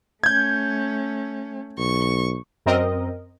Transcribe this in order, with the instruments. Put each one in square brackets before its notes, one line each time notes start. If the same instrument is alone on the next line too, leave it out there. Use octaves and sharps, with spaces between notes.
[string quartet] A3 C#4 [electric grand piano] G6 G#6
[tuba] B1 [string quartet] C#6
[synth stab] F#2 C4 A#4 D#5